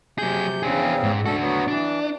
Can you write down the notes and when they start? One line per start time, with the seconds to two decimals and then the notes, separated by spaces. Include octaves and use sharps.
0.18 C3 F#3 G#4 G6
0.63 E2 C#3 C4 D4 G#4
1.03 G#2
1.25 D4 F#4 A4
1.41 F#3 B3
1.68 E3 D4